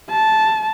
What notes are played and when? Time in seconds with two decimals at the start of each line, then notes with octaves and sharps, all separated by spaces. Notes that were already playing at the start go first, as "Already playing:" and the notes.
0.11 A5